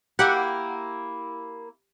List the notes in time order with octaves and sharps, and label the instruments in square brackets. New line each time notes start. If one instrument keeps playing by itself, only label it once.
[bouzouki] A#3 E4 [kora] G4 [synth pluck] F#5